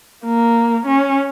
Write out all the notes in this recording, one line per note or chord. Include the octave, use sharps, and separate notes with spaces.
A#3
C#4